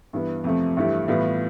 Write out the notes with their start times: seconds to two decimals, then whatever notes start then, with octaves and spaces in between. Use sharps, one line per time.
0.13 G2 E3 B3
0.44 F2 C3 F3 A3
0.77 G2 E3 A3 E4 G4
1.08 A2 E3 G3 B3 F4